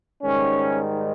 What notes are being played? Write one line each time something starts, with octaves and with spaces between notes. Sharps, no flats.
G#2 D#3 G3 C#4